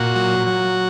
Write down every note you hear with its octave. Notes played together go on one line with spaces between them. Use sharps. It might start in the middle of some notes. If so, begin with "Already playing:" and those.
Already playing: A#2 F#4
F#3
F#3